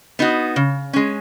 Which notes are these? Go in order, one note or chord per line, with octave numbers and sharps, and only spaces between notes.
B3 D#4 F#4
C#3
G#3 C#4